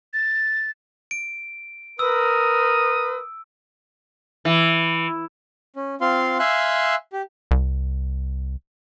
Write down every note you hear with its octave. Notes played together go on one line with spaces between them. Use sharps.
A6
D7
A#4 B4 D#6 E6
E3
C#4
C4 F4 F5 C6
E5 F5 G#5 C6 E6 F#6
G4
C2